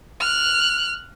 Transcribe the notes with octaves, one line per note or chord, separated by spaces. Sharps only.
F6 F#6